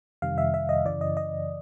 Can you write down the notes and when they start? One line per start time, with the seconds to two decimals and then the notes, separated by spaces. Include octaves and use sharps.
0.22 F2 C3 D#3 G3 F5
0.38 E5
0.54 E5
0.69 D#5
0.85 F#2 C#3 E3 D5
1.01 D#5
1.17 D#5